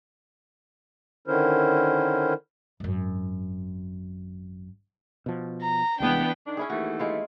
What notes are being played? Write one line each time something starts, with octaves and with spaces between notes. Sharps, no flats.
D3 D#3 C#4 E4 A#4 C5
G#1 F#2
B2 F3
A#5
C2 E3 G3 G#3 B3 D4 G5
D#3 D4
C#4 E4 G#4
D#2 E3 A3 F#4
G#3 E4 F4